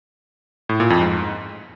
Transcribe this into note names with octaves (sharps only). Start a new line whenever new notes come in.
A2
A#2
F2
G#2